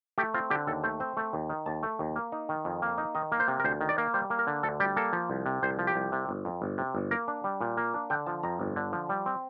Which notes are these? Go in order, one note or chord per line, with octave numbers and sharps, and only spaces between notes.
A3 G4
C4 F4
D3 G4
D#2 A4
A3 C5
C4 C5
A3
D#2
D#3
D#2 A5
A3
D#2
A#3
D#4
D#3
F2
A#3
D#4
D#3 D#5
A#3
C5
C3
A#4
D2 C5
D#3
D5
A#3
G3 C5
A#3
A#4
D3
D2 A4
G3 G4
A#3 A4
F3
C2
C3
C2 C5
F3
G4
C2
C3
G1
F2
G1
C3
G1
A#3 A#4
D4
G3
A#2
A#3
D4
D3 G5
F3 A5
F2 A#5
G1
D3
F3
G3
C4